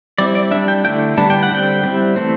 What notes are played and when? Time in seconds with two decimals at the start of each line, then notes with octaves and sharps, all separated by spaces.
0.18 G3 C4 E4 D5
0.35 D5
0.51 G3 D4 E5
0.68 G5
0.84 D3 A3 E4 G5
1.17 D3 G3 B3 D4 A5
1.30 G5
1.43 F#5
1.51 D3 G3 C4 G5
1.83 G3 C4 E4
2.16 E3 A3 C4